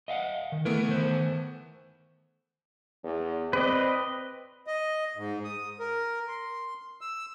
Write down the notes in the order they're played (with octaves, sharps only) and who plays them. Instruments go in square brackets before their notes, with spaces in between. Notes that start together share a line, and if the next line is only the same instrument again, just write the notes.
[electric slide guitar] D#5 F5 F#5
D#3
[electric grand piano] E3 A3 B3 [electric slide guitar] A#4
[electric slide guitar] D#3 C5
[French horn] E2
[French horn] C4 [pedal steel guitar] B4 D5 D#5
[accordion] D#5
G#2
D#6
A#4
C6
E6